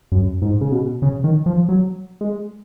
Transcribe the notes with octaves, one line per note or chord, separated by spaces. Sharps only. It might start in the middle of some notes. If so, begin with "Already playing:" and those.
F#2
G#2
C#3
B2
C#3
D#3
F3
F#3
G#3